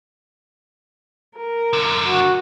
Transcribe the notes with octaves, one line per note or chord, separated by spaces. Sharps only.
A#4
F#2 D3
F#4